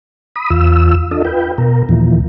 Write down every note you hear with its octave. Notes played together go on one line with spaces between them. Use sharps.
B5 D#6
E2 F4 E6
D4 F4 A4 D#5
F4 B4 G5
B2 A#4
D#2 A#2 E3 F3